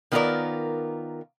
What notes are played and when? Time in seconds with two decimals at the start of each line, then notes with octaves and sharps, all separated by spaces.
0.12 D#3 B3 F4 G#4 A#4 D5